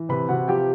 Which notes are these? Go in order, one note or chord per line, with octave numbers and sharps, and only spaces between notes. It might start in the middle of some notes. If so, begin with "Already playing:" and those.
Already playing: E3
C3 B4 B5
C3 F#4 F#5
F3 G4 G5